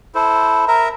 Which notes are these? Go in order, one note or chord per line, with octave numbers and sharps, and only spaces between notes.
E4 A4 C5
A#4 E5 A#5